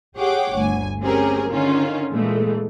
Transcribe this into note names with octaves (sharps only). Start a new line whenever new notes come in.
G4 G#4 C#5 F#5 G5 D6
G1 D2 G#5
C4 C#4 G4 G#4 A#4
D3 D#3 C#4 D#4 F4
A#2 E3 G#3 A3